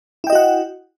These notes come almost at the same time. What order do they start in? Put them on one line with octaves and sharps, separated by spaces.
E4 G5 D#5 F#4 F#5